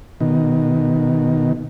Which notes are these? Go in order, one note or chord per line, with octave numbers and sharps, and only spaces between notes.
B2 D#3